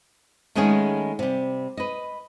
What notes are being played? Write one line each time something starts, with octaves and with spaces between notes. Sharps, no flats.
D#3 G#3 A3 B3 C#4 G#4
C3 G3
B4 D#5